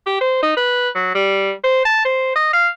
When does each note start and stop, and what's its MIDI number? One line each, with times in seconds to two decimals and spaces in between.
0.06 0.19 67
0.21 0.40 72
0.43 0.55 63
0.57 0.89 71
0.95 1.14 54
1.15 1.52 55
1.64 1.81 72
1.85 2.05 81
2.05 2.34 72
2.36 2.51 75
2.53 2.68 77